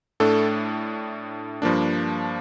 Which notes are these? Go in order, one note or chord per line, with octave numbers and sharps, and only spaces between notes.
A2 A3 D4 A4
G2 F3 A#3 D4